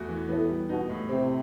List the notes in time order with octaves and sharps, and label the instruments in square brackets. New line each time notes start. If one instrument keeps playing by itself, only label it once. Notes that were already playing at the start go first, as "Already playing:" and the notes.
Already playing: [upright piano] E2 A3 F#4
E3
[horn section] A2 [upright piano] B3
[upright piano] G3
[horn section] B2 [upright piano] D#4
[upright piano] A2
[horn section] C3 [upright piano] C4